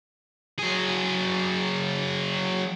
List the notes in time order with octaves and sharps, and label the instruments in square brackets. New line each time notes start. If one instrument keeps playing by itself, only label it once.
[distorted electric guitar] F#3 G#4